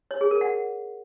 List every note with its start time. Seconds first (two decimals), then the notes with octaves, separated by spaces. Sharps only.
0.11 C#5
0.21 G#4
0.31 A#4
0.41 F#5